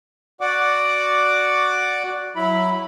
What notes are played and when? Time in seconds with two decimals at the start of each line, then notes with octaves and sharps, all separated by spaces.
0.41 F#4 D5 F#5 D6
2.36 F#3 E4 B5